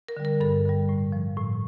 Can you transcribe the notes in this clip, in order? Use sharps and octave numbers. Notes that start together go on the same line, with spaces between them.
A#4
D3 G3
A#4
G2 A4
D3 G3
A2
F3
A2